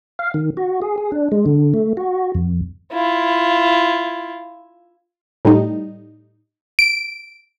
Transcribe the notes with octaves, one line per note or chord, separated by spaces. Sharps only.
F5
D#3
F#4
G#4
G#4
D4
G#3
D3
A3
F#4
F2
E4 F4
A2 G3 D#4
D7